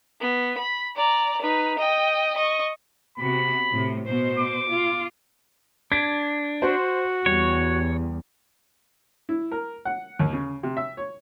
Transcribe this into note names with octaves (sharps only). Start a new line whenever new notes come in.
B3
B5
D5 A#5
D#4 B4
D#5 G5
D#5 C#6
C3 B3 F#4 B5
A2 C3
B2 C5
D6
F4
D4 G#6 B6 D7
F#4 C5
E2 G3 C#5
E4
A#4
F#5
D#2
C#3
C3
E5
C#5